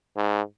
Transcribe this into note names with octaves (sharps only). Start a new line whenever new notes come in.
G#2